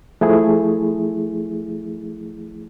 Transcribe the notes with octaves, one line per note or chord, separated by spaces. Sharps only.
F3 A3 E4 G#4